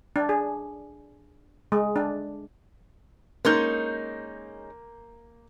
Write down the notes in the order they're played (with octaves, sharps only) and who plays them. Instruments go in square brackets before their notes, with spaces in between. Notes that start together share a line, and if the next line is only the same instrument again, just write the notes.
[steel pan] D4
G#4
G#3
D4
[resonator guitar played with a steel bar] G#3 C#4 D#4 [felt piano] A#3 G6